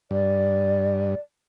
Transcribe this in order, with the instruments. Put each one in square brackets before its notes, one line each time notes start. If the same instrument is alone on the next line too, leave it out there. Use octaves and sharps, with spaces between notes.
[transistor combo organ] G2 [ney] D5